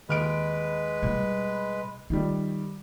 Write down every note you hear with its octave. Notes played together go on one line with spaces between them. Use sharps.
D#2 G#3 B4 F6 D7
B2 G3
D#3 G3 F4